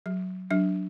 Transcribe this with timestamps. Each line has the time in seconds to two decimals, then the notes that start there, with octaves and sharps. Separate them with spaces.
0.06 F#3
0.51 F#3 D4